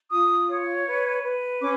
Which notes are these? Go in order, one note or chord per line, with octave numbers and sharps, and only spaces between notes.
F4 D#6
C#5
B4
B4
C#4 D6